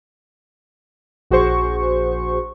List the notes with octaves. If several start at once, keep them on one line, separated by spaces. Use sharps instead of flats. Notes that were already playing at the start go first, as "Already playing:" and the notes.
A#1 F#4 G#4 C5 C#6